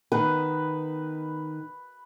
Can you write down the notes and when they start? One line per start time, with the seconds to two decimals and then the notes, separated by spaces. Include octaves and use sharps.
0.12 D#3 B3 B4